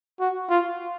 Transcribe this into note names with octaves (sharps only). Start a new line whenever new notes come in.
F#4
F4